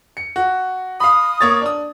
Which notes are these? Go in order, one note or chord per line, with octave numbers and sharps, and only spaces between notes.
C#7
F#4
F5 B5 D#6
A#3 C#5 A6
D4 D#6